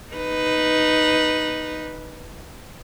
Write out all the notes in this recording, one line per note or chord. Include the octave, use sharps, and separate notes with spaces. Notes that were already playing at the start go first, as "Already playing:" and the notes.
D#4 B4